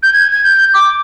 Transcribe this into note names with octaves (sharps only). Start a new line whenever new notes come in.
G6
G#6
G#6
G6
D6